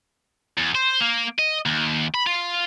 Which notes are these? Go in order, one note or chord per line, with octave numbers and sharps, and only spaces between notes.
E2
C5
A#3
D#5
D#2
B5
F4